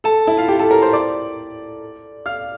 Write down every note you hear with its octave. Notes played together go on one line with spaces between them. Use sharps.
A4 A5
E4 E5
F4 F5
G4 G5
A4 A5
A#4 A#5
C5 C6
D5 D6
F5 F6